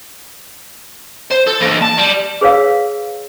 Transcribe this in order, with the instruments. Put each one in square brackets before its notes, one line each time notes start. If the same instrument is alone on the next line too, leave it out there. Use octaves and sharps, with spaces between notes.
[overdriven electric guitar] C5
A4
E3 A#3
A5
G3
[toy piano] G#4 B4 C#5 F5 E6